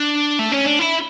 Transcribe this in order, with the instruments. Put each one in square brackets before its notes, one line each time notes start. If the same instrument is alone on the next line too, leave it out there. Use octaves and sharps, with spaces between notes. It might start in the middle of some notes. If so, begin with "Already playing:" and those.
Already playing: [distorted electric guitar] D4
A3
C#4
D4
E4